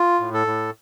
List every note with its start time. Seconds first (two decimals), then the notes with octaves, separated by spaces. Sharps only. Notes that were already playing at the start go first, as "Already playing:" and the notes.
Already playing: F4
0.20 A2
0.34 A4
0.47 A2